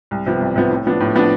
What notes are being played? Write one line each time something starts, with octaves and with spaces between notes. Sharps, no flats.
C2
C3 F3 B3
C2
C3 F3 B3
A2
F3 B3 D4
A2
F3 B3 D4